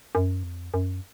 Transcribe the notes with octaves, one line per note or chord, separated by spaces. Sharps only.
F#2
F2
F#2